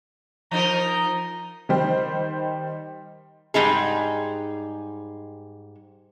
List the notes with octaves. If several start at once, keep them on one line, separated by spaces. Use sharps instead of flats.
F3 D#4 A#4 A#5
D#3 G3 C5
G#2 C#3 G3 D#4 G#4